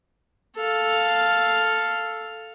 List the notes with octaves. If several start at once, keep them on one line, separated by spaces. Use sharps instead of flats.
A4 F5